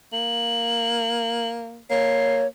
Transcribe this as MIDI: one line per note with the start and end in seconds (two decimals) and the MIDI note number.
0.13 1.83 58
0.13 1.48 102
1.90 2.45 58
1.90 2.47 73
1.90 2.35 96